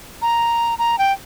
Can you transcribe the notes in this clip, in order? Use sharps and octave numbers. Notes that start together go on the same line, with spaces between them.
A#5
A#5
G5